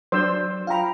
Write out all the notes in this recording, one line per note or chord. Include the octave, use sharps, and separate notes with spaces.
F#3 D4 C5 D5 E6
F4 F5 G5 A#5 B5